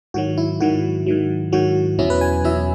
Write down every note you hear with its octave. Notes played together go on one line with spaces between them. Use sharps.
G#2 D#3 F#3 F#4
E4
G#2 D#3 F#3 F#4
G#2 D#3 F#3
G#2 D#3 F#3 F#4
E2 B2 F#3 C#4 E4
B4
G#5
E2 B2 F#3 C#4 E4 E5